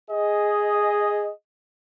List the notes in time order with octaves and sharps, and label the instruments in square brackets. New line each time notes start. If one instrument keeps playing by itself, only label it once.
[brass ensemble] G#4 D#5